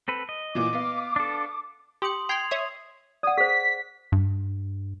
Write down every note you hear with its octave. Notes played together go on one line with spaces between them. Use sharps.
C4 A4 B4
D#5
A#2 E3 D6
B3 F5
D4 A4
G4 C6 D#6 C#7 F#7
G5 C6 G#6 C7 F7
C#5 E5 D#6
D5 F#5 D#6
G#4 C5 B6
G2